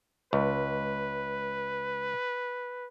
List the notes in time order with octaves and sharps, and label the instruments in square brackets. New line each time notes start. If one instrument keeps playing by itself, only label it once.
[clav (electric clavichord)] C#2 [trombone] B4